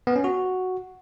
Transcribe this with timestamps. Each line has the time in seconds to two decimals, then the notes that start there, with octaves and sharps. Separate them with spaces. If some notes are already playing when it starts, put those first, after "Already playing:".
0.07 B3
0.16 C#4
0.24 F#4